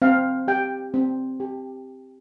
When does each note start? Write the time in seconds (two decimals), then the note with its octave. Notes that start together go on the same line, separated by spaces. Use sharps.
0.02 C4 F5
0.48 G4 G5
0.94 C4
1.40 G4